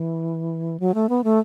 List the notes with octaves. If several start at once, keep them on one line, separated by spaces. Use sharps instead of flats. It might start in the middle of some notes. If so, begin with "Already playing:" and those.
Already playing: E3
F#3
A3
B3
A3